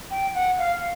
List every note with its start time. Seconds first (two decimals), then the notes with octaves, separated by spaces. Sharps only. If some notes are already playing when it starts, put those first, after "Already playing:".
0.11 G5
0.35 F#5
0.59 F5